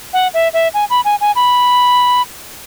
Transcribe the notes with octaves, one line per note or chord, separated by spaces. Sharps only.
F#5
E5
E5
G#5
B5
G#5
G#5
B5